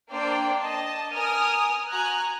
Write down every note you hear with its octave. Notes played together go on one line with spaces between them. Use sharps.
A#3 D4 C5 D5 G5
D#5 A5
A#4 G#5 D#6 F6
F#4 G#5 A#5 F#6